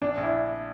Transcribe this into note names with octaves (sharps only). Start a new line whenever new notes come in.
A#1 D4
A#1
E4